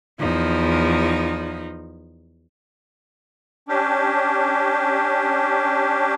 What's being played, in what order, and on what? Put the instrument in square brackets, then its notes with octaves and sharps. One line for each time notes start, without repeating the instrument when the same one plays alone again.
[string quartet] E2 F3 D#4
[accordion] C#4 D4 G4